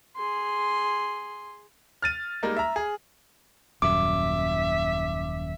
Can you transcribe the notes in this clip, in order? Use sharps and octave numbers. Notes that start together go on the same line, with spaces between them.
G#4 C6
F6 A6 D#7
G3 G#3 A#3 D#4
E5 A#5
G#4
D#1 F#2 E5 D6